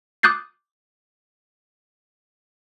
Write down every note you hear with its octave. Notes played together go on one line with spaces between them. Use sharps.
D6 D#6 F#6 G6 A6 C7